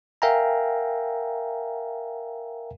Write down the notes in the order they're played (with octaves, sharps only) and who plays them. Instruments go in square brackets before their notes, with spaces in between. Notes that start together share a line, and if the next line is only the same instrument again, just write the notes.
[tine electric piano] A#4 E5 F5 G5 G#5 A#5